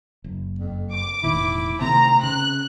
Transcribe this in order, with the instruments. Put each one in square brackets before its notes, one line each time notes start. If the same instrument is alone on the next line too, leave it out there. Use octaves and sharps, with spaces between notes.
[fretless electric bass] F#1
[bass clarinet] F2
[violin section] D6
[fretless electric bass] E1 A2 D#3 [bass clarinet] E4
[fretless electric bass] C3 D#3 A3 [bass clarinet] C4 [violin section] A#5
[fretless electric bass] C#3 [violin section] F#6